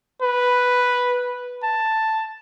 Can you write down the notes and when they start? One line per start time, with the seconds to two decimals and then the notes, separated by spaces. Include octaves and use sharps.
0.22 B4
1.63 A5